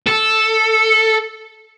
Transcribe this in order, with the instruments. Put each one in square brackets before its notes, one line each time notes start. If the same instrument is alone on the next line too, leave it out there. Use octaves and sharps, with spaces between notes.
[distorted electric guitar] A4